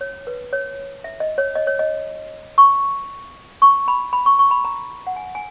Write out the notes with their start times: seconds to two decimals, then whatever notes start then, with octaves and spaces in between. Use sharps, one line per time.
0.01 C#5
0.27 B4
0.53 C#5
1.04 E5
1.20 D#5
1.38 C#5
1.56 D#5
1.67 C#5
1.79 D#5
2.58 C#6
3.62 C#6
3.88 B5
4.13 B5
4.26 C#6
4.39 C#6
4.51 B5
4.64 A#5
5.07 F#5
5.16 G#5
5.35 G#5